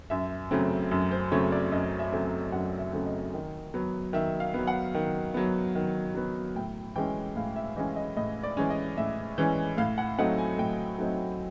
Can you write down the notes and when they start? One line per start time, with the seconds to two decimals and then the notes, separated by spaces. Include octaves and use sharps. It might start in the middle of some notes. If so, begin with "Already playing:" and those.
0.10 F#2 E5
0.51 C#3 F#3 A3 C4
0.91 F#2
1.11 C5
1.32 C#3 F#3 A3 C4 C#5
1.52 D5
1.72 F#2 D#5
1.99 E5
2.12 C#3 F#3 A3 C4
2.52 F#2 F#5
2.79 E5
2.93 C#3 F#3 A3 C4
3.06 D#5
3.34 D#3
3.74 F#3 B3
4.13 D#3 E5
4.40 F5
4.54 F#3 B3
4.67 F#5
4.94 D#3
5.34 F#3 B3
5.75 D#3
6.15 F#3 B3
6.55 A2 G5
6.96 E3 G#3 C#4 G5
7.36 A2 F5
7.56 E5
7.76 E3 G#3 C#4 D#5
7.96 D#5
8.17 A2 D#5
8.43 D5
8.57 E3 G#3 C#4
8.70 D#5
8.97 A2 E5
9.38 E3 G#3 C#4
9.77 A2 F5
9.98 F#5
10.18 F#3 A3 C4 D#4 F#5
10.38 G#5
10.58 A2 G5
10.98 F#3 A3 C4 D#4